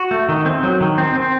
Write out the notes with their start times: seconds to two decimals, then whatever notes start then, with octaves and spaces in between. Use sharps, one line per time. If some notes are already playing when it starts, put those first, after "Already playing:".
Already playing: F#4
0.11 A3
0.29 D#3
0.46 C4
0.63 F#3
0.81 D#3
0.98 C4
1.15 C4